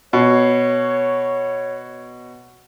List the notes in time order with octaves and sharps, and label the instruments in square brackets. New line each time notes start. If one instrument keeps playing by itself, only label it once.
[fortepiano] B2 [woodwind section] C#5